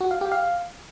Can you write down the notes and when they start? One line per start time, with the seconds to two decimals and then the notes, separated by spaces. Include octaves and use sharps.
0.01 F#4
0.11 F5
0.21 G4
0.32 F5